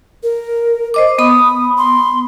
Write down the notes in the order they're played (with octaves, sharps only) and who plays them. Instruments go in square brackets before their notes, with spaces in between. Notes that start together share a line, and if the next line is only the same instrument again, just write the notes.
[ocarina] A#4
[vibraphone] C5 D#5 D6
[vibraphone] B3 B5 [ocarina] D#6
[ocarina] C6